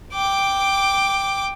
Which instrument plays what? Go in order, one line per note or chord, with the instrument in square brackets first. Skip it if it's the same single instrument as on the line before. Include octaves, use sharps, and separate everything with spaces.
[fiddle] G5 D6